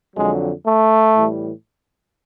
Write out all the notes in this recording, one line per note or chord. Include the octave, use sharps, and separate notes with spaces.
F2 D3 F#3 G#3
A3
A2 E3 G3